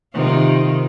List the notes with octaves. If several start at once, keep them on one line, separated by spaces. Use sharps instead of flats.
C3 D#3 F4